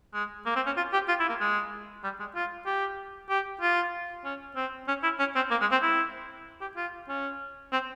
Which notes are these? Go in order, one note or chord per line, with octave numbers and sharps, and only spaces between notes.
G#3
A#3
C4
C#4
F4
G4
F4
E4
A#3
G#3
G3
G#3
F4
G4
G4
F4
C#4
C4
C#4
E4
C#4
C4
A#3
G#3
C4
E4
G4
F4
C#4
C4